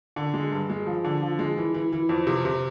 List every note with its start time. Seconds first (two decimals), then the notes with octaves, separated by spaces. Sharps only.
0.16 D3
0.34 G#3
0.52 G2
0.70 G#3
0.86 F3
1.04 D3
1.22 F3
1.39 G#3
1.58 E3
1.74 E3
1.92 E3
2.09 F2
2.27 C3
2.45 C3